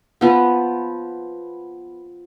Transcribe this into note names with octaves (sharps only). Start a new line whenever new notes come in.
F3 B3